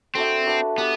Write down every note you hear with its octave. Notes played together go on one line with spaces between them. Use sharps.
A3 C4 D4 F#4 A4
D4 F#4 B4 D5
B3 D4 G4